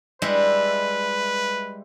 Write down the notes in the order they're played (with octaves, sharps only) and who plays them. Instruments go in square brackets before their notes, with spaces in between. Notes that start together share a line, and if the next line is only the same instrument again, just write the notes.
[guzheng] G3 G#3 E4 [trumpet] B4